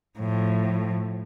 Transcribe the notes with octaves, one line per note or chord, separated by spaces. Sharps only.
A2 F3